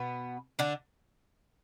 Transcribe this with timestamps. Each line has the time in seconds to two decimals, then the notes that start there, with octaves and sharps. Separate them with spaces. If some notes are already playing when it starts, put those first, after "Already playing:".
Already playing: B2 B3
0.59 D3 D4